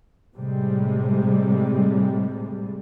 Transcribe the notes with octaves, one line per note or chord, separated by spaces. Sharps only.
A2 C3 G3 G#3